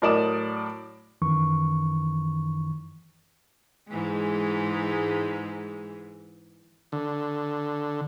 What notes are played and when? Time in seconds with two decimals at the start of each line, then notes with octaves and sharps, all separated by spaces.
0.02 A2 F#3 A#4 D5 D#6 E7
1.22 F#2 D#3 E3 C#6
3.89 G#2 E3 G#3
6.92 D3